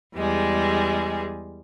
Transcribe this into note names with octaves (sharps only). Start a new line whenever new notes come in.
E2 G3 G#3 G#4